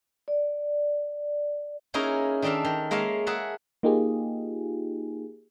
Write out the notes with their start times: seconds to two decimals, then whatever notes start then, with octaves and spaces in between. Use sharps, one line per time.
0.28 D5
1.94 A#3 C#4 D#4 E4 G#4 A#4
2.42 D#3 D4 D#4 A4 E5 F5
2.65 D#3
2.91 G#3 A#3 C#5 E5 F5
3.27 G#4 A#4 E5 F#5 A5
3.83 A#3 D#4 F4 G4 G#4